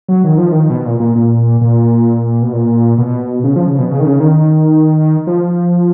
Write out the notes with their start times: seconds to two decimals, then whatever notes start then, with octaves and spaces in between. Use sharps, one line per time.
0.08 F#3
0.24 D#3
0.38 F3
0.52 D#3
0.70 B2
0.85 A#2
1.00 A#2
1.16 A#2
1.61 A#2
2.42 B2
2.53 A#2
2.98 B2
3.44 C#3
3.56 F3
3.67 C#3
3.78 B2
3.91 C#3
4.00 D#3
4.05 C#3
4.20 D#3
5.27 F3